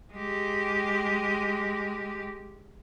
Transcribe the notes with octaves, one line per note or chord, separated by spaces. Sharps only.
G#3 G4